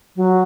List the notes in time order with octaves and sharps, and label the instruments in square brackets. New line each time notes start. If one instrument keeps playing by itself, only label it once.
[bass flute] F#3